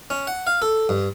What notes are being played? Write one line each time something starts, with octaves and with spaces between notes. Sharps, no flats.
C#4
F#5
F5
A4
G2